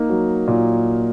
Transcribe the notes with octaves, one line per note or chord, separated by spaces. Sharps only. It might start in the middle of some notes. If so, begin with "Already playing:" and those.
Already playing: A#3 D#4
F#3
A#2